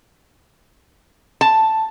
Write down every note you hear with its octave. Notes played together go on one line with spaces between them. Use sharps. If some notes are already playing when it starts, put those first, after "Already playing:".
A5